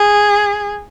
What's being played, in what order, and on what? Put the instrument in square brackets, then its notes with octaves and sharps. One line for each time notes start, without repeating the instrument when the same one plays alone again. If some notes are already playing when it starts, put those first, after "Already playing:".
Already playing: [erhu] G#4